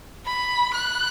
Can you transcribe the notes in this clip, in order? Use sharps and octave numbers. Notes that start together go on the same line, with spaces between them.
B5
F#6